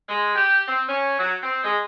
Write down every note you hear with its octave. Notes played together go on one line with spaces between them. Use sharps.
G#3
G4
C4
C#4
F#3
C4
G#3